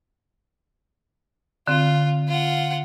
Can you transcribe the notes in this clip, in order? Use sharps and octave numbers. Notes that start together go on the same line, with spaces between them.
D3 C4 F4
F4 F#5